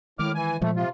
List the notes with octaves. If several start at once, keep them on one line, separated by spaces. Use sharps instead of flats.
A2 D#3 G#3 D6 F6
E3 G#5
A#2 F3 G#3 A3
C3 F4